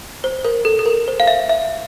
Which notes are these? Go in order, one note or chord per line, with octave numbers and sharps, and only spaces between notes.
C5
A#4
A4
A4
A#4
C5
F5
E5
E5